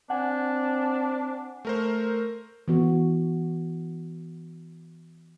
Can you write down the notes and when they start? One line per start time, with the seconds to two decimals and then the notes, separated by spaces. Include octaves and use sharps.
0.10 C4 D4 F#5 G#5
1.65 A3 A#4 C5
2.68 E3 B3 F#4